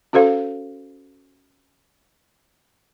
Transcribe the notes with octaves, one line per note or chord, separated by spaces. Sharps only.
C#4 F#4 A4 C5 F5